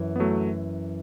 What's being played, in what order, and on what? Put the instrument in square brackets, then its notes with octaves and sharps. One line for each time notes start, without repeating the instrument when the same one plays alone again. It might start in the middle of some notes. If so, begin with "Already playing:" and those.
Already playing: [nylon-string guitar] F#2 E3
[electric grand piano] B3
F#3 A3